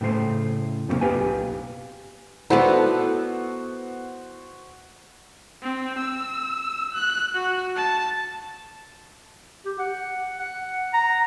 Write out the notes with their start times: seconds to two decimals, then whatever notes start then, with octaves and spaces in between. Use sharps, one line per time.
0.01 A2 C#3 A3 C5
0.88 F#2 C3 G3 G#3 A#3 C#4
1.01 B1 G4 B4 F5 G#5
2.50 B3 E4 F#4 A4 C5 D5 F#5
5.63 C4
5.98 E6
6.94 F#6
7.35 F#4
7.76 A5
9.65 G4
9.79 F#5
10.39 F#5
10.94 A#5